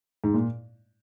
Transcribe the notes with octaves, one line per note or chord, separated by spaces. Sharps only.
G#2
A#2